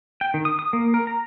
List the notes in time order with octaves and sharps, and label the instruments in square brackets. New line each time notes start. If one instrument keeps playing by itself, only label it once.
[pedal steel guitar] G5
D#3
D#6
D#6
A#3
A#4
A#5